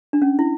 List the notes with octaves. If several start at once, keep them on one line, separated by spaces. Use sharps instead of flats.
D4
C#4
E4